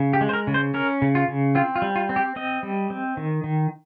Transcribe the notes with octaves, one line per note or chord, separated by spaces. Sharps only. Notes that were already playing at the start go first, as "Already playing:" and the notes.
Already playing: C#3
G4
G#3
C5
A#4
C#3
C5
C#4 A#4
C#3
F4
C#3
C4 F4
F4
G3
F4
C4
G4
C4 D#5
G3
C4
D#3
D#3